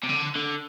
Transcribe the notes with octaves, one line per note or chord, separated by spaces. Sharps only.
C3
D3
D3